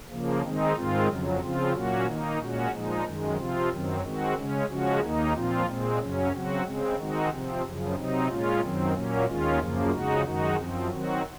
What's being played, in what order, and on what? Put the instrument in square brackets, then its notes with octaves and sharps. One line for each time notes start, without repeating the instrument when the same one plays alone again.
[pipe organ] C#3 F3 A#3
D#3 G#3 C4 D#4
G#2 D#3 G#3 C4 F4
F2 C#3 F#3
C#3 F3 C4 F4
A#2 F#3 A#3 C#4 F#4
D#3 A#3 D#4
A#2 G#3 C#4 F#4
A#2 F3 G#3 D#4
F#2 D#3 G#3
C3 F3 C4 F4
F#2 D#3 F#3 C4
D#3 G#3 C4 F#4
C#3 G#3 C#4
C#3 F3 G#3 C#4 F#4
D#2 D#3 A#3 D#4
A#2 F3 C4 F4
A#2 G#3 C4
F#2 C#3 F#3 C#4
C#3 F#3 C4 F#4
C#3 G#3 C4
D#3 G#3 C4 D#4 F#4
C3 F3 C4
F#2 C#3 F3
C3 F#3 C4 D#4
A#2 G#3 C#4 F4
F#2 D#3 F#3 C4
A#2 F#3 A#3 C#4
D#2 D#3 G#3 C#4 F4
F#2 C#3 F3 A#3
F2 C#3 G#3 D#4 F#4
F#2 D#3 G#3 D#4 F#4
F#2 F3 C4
D#3 F#3 C4 F#4